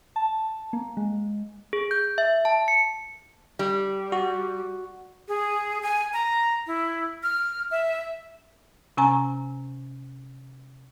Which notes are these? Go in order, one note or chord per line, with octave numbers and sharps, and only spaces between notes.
A5
A#3
G#3
G#4
G6
E5
A5
C#7
G3
F#4
G#4
G#5
A#5
E4
F6
E5
C3 C#4 G#5 A#5